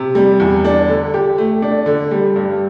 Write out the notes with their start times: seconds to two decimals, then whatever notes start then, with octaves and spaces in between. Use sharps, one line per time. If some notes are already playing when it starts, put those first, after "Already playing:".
Already playing: C3
0.15 G3
0.40 E2
0.65 D4
0.88 D3
1.14 G4
1.38 A3
1.62 D4
1.86 D3
2.11 G3
2.36 G2